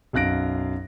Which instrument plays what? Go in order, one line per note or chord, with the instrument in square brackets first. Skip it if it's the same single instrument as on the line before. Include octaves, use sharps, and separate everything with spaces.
[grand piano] B1 F#2 F5 F#6 A#6 D7